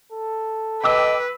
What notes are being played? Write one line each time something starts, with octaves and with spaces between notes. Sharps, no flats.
A4
B4 D#5 G5 D6 E6